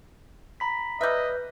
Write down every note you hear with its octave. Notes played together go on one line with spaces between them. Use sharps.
A#5 B5 B6
G3 B4 D#5 E5 F#6 G6